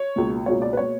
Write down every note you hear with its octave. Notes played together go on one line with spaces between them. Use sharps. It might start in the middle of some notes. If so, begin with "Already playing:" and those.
Already playing: C#5
C#2 B2 A#3
C#2 B2 A#3 C#5
D5
B4
B2 A#3 C#5